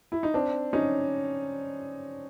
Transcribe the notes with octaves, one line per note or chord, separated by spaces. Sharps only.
E4
D#4
C4 D4
C#4 D#4